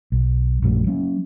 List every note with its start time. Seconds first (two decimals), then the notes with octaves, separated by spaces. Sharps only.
0.12 B1
0.62 A#1 F#2 F#3 A3
0.87 F#3 A#3 C#4